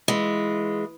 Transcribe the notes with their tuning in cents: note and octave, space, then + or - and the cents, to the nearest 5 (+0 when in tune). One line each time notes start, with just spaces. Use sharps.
E3 -5 G#3 +0 F4 +0